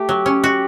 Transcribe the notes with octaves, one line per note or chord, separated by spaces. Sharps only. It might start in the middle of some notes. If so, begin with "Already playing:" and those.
Already playing: A3 G4
F#3
C#4
F#4